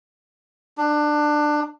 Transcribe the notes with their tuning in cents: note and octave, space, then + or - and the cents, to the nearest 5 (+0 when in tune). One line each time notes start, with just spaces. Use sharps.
D4 +20